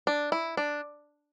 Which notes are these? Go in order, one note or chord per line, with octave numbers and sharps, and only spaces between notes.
D4
E4
D4